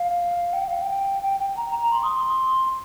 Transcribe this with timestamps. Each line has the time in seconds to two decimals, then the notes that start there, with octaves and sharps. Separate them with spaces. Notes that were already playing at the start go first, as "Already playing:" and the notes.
Already playing: F5
0.53 G5
0.68 F5
0.82 G5
1.23 G5
1.40 G5
1.57 A#5
1.75 A#5
1.92 C6
2.03 D#6
2.15 C6